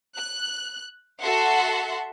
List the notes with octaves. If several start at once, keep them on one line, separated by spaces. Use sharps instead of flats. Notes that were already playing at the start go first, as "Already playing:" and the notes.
F#6
F#4 A4 E5 F#5 C6